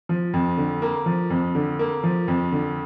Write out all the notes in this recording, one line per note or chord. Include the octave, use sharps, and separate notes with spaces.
F3
F2
D3
A#3
F3
F2
D3
A#3
F3
F2
D3